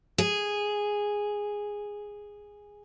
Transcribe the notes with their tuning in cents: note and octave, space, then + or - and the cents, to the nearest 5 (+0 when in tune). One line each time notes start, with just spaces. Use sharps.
G#4 -5